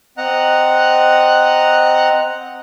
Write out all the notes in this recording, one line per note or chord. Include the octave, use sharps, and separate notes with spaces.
C4 D#5 F#5 A#5 F#6